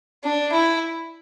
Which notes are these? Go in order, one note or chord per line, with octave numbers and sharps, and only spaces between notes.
D4
E4